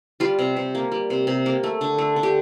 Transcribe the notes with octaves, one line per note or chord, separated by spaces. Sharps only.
G3 F4
C3
C3
A#3
G3
C3
C3
A#3
A3
D3
A3
D3
G4